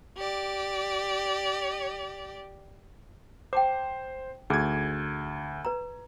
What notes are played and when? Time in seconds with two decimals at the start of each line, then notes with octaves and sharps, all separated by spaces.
0.18 G4 D5
3.53 C5 G5 A5 D6
4.50 D2 D#4 G#4 D6 G#6
5.65 B4 A#5